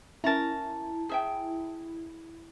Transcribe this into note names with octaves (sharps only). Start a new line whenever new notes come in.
C#4 E4 A#4 A5 A#5
G#4 E5 G5